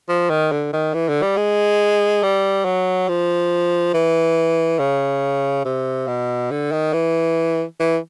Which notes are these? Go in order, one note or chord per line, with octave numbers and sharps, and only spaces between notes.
F3
D#3
D3
D#3
E3
D3
G3
G#3
G3
F#3
F3
E3
C#3
C3
B2
D3
D#3
E3
E3